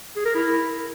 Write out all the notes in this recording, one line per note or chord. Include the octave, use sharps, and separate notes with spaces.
G#4
A#4
E4